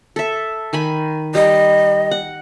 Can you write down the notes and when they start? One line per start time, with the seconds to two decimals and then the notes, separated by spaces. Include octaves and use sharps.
0.16 A4 E5
0.73 D#3 G#5 B5
1.35 G3 D#5
2.11 F#5